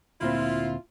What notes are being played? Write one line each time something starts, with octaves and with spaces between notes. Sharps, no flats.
D2 A#2 C4 E4 F4